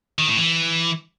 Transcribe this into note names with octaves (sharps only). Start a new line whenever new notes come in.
D#3
A2
E3